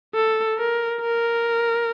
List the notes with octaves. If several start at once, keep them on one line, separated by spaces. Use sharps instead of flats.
A4
A#4
A#4